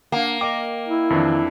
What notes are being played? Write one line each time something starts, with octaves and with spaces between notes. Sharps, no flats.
A#3 D4 F5 F#5
A#4 D#5 G5 D6
E4
F2 D#3 E3 D4